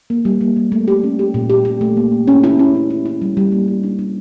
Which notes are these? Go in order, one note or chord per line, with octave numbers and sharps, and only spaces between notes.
A#3
G3
A#3
A#3
A3
G4
C#4
G4
A#2
G4
G4
A3
A#3
A#3
C#4
E4
C#4
C#4
E4
E4
G3
G3
A#3
G3
D4
D4